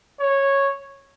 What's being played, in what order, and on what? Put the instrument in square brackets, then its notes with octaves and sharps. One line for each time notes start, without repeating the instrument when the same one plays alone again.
[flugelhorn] C#5